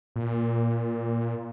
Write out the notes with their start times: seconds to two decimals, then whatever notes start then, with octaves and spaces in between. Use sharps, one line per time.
0.16 A#2